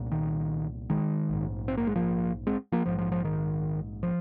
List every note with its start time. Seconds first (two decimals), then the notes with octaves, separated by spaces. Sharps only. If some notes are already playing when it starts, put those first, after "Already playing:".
Already playing: C2 A#2
0.12 D#3
0.90 D#3 G#3
1.30 A#1 G#2
1.68 C4
1.77 A#3
1.87 G#3
1.96 F3 A#3
2.47 G#3 C4
2.72 F3 A#3
2.86 A#1 G#2 F3
2.98 F3
3.12 F3
3.24 D#3
4.03 F3